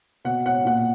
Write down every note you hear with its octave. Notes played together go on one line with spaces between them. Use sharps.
B2 F#5
F#5
A#2 F#5